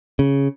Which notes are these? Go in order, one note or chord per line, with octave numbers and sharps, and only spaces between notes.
C#3